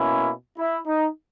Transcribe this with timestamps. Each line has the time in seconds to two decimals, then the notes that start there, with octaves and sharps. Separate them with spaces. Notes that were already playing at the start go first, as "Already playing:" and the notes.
Already playing: B2 A#3 C#4 E4
0.58 E4
0.86 D#4